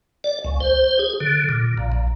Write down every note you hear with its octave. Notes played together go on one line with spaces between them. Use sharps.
D5
C#2
C5
G#4
D3
A#2
A#1
A#1